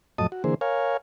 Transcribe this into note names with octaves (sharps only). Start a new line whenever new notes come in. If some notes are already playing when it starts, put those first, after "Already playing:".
F2 A2 F#3 D#5 A5 D#6
F#4
D3 E3 A#3 G#4 C5
A#4 C#5 F5 G#5